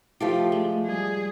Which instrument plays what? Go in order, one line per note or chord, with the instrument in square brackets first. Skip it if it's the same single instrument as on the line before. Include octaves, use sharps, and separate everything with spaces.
[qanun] F3 A3 G4
[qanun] G#3 [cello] A3
[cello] G3 G#4